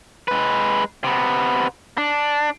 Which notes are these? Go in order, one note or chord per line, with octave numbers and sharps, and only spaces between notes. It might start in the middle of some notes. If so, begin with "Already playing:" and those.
G#3 B4
C3 B3
D4